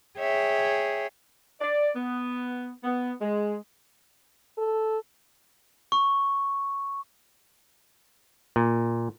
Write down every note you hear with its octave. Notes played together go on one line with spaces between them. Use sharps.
G#4 C#5 E5 G5
D5
B3
B3
G#3
A4
C#6
A#2